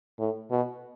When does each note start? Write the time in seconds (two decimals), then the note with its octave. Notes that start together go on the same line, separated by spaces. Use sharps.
0.19 A2
0.51 B2